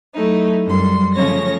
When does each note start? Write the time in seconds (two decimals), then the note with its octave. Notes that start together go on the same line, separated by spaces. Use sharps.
0.13 F#3 A3 D#4 E4
0.65 F#2 G3 C6
1.14 C#3 F3 A3 C#5 A#6